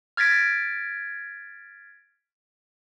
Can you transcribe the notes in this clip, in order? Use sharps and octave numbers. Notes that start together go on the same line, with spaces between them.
F6 G#6 A6 B6 D7